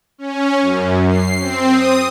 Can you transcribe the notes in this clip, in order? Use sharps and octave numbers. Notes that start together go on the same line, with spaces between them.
C#4
F#2
C7
C4
D#6